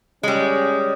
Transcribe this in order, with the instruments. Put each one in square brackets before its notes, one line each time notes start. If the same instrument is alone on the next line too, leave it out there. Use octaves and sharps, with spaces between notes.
[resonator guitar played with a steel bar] G3 G#3 [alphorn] C#4